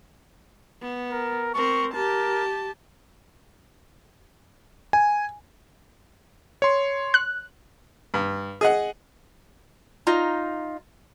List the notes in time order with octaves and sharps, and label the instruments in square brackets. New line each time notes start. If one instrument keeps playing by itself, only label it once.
[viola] B3
[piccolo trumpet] A#4
[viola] C4 A#4 [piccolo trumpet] C#6
[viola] G4 A5 [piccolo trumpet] A#4
[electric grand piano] G#5
C#5 C6
[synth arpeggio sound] F#6
[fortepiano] G2
G#4 D#5 F#5
[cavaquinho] D#4 F4 A#5